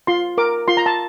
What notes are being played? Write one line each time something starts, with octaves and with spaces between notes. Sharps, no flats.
F4 C6
A#4 D6
F4 C6
A#5
A5